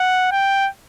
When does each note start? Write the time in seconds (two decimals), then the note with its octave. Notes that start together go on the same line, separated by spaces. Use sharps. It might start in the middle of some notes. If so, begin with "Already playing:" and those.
Already playing: F#5
0.32 G5